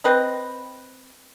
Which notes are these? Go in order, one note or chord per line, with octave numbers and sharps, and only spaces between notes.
C4 B4 D#5